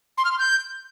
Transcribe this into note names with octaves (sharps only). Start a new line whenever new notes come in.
C6
F6
C6
G6